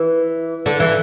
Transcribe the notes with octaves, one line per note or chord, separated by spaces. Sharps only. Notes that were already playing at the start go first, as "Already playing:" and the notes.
Already playing: E3
D3
E3